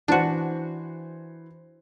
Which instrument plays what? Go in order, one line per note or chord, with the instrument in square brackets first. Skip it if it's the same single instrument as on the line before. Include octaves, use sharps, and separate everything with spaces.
[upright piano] E3 C5 [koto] D4 F#4